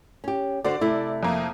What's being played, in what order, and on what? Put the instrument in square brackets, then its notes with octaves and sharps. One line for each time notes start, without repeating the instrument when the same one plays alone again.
[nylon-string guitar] C#4 G4
[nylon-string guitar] D3 F#4 C5 [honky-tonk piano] D5
[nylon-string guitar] C3 A3 E4
[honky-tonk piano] F2 A#3